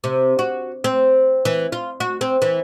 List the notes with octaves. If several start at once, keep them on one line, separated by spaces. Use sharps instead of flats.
C3
F#4
C4
E3
F4
F#4
C4
E3